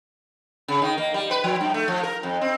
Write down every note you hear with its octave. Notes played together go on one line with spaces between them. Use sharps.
C#3
D#3
A#3
G3
B4
F3
G2
A3
F3
A#4
F2
C4